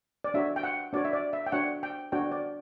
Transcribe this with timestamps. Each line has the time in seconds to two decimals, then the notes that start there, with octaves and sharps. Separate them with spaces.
0.24 D5
0.34 D4 F#4 C#5 E5
0.56 G5
0.63 F#5
0.93 D4 F#4 C#5 D5
1.05 E5
1.13 D5
1.33 E5
1.46 G5
1.52 D4 F#4 C#5 F#5
1.83 G5
2.12 D4 F#4 C#5 G5
2.32 D5